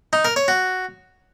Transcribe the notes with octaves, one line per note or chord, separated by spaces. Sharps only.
D#4
A#4
C#5
F#4